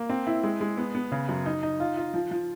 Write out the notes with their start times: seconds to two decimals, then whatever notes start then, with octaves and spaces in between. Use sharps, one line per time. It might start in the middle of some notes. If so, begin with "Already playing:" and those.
Already playing: A#3
0.09 C4
0.27 E4
0.43 G#3
0.61 G#3
0.77 B3
0.95 B3
1.12 C#3
1.29 F#2
1.46 D#4
1.63 D#4
1.80 F4
1.97 F4
2.14 F3
2.31 F3